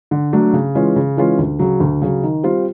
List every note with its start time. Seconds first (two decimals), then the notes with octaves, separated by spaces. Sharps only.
0.11 D3
0.33 F#3 A3 D4
0.53 C#3
0.75 E3 G#3 C#4 F4
0.96 C#3
1.17 E3 G#3 C#4 F4
1.39 D2
1.59 C#3 F#3
1.80 D2
2.02 C#3 F#3
2.23 D#3
2.43 G3 C4 F4